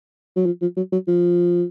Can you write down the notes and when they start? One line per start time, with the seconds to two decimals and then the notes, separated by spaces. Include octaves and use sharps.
0.36 F#3
0.46 F3
0.62 F3
0.77 F#3
0.93 F#3
1.07 F3